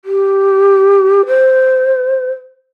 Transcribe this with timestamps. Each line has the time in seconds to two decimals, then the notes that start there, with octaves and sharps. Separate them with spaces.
0.05 G4
1.27 C5